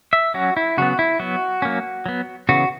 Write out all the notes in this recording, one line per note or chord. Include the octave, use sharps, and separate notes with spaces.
E5
F#3 C#4 F#4
E4
C#3 F#3 B3 F#4
E4
F#3 B3 F#4
F#3 A#3 C#4
F#3 B3
C#3 E3 B3 F#4